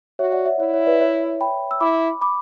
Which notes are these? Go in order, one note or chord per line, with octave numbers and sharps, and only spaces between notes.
F#4 C#5 E5
D5 F#5
C#5 E5
E4 C#5 E5
C#5
B4 D5
C#5 E5
G5 B5
E6
E4 B5 D6
B5 D6